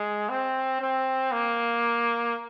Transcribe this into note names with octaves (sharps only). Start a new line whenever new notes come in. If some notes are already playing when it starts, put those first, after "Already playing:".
Already playing: G#3
C4
C4
A#3